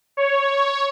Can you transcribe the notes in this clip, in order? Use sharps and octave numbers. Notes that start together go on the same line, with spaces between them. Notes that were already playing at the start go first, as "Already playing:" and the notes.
C#5